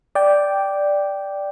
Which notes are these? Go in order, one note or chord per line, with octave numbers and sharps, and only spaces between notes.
D5 G5